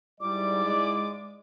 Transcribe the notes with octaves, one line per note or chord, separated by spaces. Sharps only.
G#2 G3 E4 D5 D6
G#3